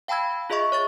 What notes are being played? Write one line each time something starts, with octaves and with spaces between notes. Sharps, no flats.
F5 G5 A5 B5 E6 G#6
F4 G#4 D#5 E5 C#6
C#5 C#6 A6